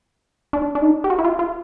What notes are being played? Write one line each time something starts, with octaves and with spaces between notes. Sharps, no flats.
D4
D4
D#4
G4
F#4
E4
F4
F4